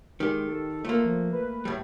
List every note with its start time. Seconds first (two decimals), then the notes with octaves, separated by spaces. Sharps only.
0.20 D#3 G#3 G4
0.48 A4
0.85 A3 A#3 F4
1.05 F3
1.32 B4
1.65 A2 G3